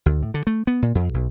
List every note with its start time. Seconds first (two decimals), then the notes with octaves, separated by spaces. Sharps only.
0.06 D2
0.23 A2
0.34 D3
0.47 A3
0.67 B3
0.82 A#2
0.95 F2
1.14 B1